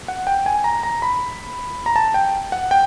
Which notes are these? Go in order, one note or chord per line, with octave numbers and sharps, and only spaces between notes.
F#5
G5
G#5
A#5
A#5
B5
A#5
A5
G5
F#5
G5